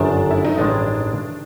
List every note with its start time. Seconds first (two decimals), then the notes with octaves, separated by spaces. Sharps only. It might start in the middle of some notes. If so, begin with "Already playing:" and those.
Already playing: G1 F#2 D#3 D4
0.31 E4
0.45 D#4
0.58 A1 G2 D#3 G#3 D4